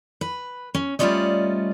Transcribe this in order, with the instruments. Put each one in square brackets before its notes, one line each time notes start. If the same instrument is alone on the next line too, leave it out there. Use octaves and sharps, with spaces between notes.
[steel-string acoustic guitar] B4
C#4
G3 A3 C#4 F4 D5 D#5